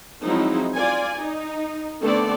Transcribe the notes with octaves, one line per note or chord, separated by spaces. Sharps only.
F3 F#3 G#3 C4 D#4 E4
F4 D5 G#5
D#4
D3 A3 B3 C4 A4 D5